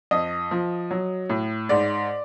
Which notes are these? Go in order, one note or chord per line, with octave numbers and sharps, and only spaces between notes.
F2 D#5
F3
F#3
A2
G#2 D5